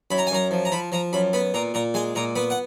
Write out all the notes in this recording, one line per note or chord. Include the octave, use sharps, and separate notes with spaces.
F#2 B5
A#5
G#5
F#2 A#5
F3
A#5
F3 B5
F3 A#5
F#2 B5
B3 B5
A#2 A#5
A#2 A#5
G#3 G#5
A#2 A#5
B3 B5
F#5